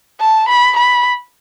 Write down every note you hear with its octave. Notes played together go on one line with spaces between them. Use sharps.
A5
B5
B5